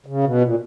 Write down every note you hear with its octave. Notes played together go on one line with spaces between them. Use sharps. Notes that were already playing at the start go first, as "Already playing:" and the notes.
C#3
B2
A#2